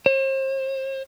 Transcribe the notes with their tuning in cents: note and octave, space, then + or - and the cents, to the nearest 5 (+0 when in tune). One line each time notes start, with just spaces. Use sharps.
C5 +40